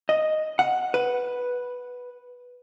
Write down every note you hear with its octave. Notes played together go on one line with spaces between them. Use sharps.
D#5
F#5
B4